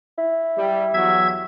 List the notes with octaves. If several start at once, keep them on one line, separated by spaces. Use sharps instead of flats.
E4
G3
E2 F#3 F#4 E5 G#6